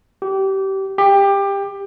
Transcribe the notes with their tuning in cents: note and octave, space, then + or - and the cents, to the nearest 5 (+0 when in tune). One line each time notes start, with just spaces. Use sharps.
G4 -25
G4 +20